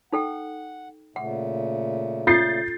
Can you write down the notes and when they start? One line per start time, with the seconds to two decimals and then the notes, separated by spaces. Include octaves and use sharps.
0.13 D#4 A4 F#5 G5
1.16 A#2 C#3 A3 F#5
2.27 F4 A4 G6 A6 C7